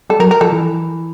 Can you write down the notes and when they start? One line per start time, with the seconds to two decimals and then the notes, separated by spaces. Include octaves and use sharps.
0.10 G3 A4
0.20 F#3 A#4
0.31 A#4
0.41 F3 A4
0.52 E3